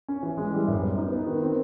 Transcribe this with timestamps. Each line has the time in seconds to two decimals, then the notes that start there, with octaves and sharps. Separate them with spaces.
0.08 C#4
0.23 E3
0.37 G#3
0.53 G3
0.68 F#2
0.83 B3
0.97 D#4
1.12 B3
1.27 D#3
1.43 C4